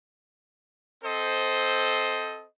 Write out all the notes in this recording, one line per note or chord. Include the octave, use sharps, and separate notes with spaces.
C4 A4 C5 D#5